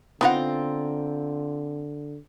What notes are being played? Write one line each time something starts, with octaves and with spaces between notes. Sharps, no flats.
D3 B3 C4 D#4 F4 F#5 A#5